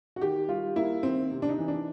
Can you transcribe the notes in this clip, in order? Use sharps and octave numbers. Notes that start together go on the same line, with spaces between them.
F#4
D#3 G4
G3 F4
A#3 E4
D#3 C4
C3
D4
D#4
E3
D4